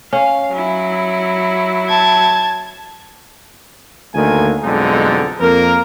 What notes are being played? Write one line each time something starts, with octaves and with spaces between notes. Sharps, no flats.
C#4 F5
F#3 E4
A5 G#6
D2 D3 D#3 A#3 G#5
B1 F2 D3 G#3 D#4
F2 A#3 A#4